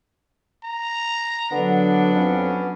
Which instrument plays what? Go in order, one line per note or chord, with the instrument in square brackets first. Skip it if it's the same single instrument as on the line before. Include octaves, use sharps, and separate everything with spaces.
[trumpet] A#5
[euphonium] D3 [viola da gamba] F#3 D4 [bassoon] B3
[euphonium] F2 [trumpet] C#4